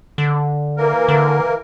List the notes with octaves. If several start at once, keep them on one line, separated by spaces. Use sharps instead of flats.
D3
E3 A#3 A#4
D3